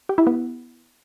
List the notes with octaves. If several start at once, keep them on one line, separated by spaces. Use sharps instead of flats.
G4
E4
B3